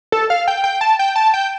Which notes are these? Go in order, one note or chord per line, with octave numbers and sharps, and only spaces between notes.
A4
F5
G5
G5
A5
G5
A5
G5